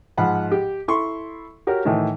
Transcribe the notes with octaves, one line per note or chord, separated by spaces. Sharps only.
G#2 F3 F#5 B5
G4
E4 A4 C6 C#6
F#4 G4 A#4 C#5
A2 D#3 E3